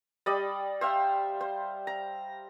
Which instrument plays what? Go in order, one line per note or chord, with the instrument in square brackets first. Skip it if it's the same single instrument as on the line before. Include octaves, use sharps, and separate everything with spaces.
[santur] G3 D5 D#5 B5
C5 E5 F5 G5
C5
A#5